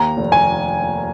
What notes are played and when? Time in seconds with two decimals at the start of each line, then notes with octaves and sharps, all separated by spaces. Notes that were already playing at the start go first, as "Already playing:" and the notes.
Already playing: D#2 A#5
0.17 F1
0.32 G#5